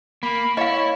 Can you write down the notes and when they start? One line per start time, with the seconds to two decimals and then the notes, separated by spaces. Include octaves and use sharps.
0.23 A#3 B5
0.57 E4 C#5 D#5 F5